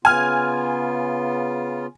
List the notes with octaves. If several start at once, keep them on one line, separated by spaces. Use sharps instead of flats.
C#3 B3 F4 G#5 F6